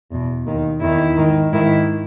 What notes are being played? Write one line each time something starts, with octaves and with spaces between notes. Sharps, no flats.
E2 B2
D#2 D#3
E2 D#3 E4
G#2 D#3
G#2 D#3 E4